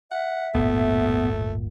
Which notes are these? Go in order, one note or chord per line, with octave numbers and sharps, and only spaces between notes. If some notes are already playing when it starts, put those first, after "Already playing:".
E5 F#5
D1 G1 A#2 A3 B3